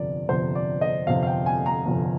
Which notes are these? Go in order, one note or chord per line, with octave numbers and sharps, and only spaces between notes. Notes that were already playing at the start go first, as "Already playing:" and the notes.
Already playing: G1 F2 C3 D5
G1 F2 C3 C5
D5
D#5
G1 F2 C3 F5
F5
G5
G#5
A#5
G1 F2 C3